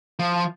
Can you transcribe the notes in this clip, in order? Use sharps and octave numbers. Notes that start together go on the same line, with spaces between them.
F3